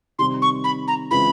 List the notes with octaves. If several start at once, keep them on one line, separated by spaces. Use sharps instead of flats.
C3 D#3 G3 C4 C6
C#6
B5
A#5
C#3 E3 G#3 C4 F4 B5